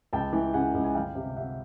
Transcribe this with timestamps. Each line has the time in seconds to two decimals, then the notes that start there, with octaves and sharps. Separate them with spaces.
0.13 C#2 G5 A5
0.33 E3
0.53 C#3 F#5 G#5
0.74 C#2
0.84 G#5
0.95 G1 F5 G5
1.15 C3
1.36 C3 E5 F#5